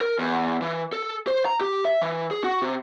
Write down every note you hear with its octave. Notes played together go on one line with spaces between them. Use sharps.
A#4
E2
E3
A4
C5
A#5
G4
E5
E3
G#4
F#4
C3